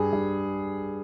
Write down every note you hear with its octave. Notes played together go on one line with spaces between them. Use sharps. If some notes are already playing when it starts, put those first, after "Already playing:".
Already playing: G2 G#4
G2